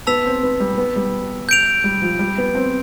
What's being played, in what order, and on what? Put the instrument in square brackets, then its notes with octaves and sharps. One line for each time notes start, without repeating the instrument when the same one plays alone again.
[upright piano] B3 [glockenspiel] A5 E6 B6 F7
[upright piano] C4
B3
G3
B3
G3
[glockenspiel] G6 D7 F7
[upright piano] G3
F3
G3
B3
C4